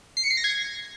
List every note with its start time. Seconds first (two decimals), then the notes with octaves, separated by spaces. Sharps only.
0.17 C7
0.24 C#7
0.30 C7
0.37 A#6
0.44 G#6